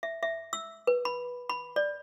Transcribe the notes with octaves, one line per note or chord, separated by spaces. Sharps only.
E5
E5
E6
B4
B5
B5
D5